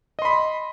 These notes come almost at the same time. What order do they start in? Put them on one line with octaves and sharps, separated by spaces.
D#5 C6 B5